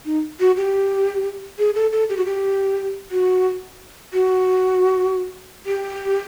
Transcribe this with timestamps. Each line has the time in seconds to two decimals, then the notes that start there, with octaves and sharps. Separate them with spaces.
0.06 D#4
0.40 F#4
0.57 G4
1.59 G#4
1.75 A4
1.92 A4
2.09 G4
2.17 F#4
2.25 G4
3.11 F#4
4.13 F#4
5.66 G4